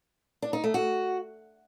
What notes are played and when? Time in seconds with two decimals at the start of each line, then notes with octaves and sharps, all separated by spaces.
0.42 D4
0.53 D#4
0.64 A3
0.74 F#4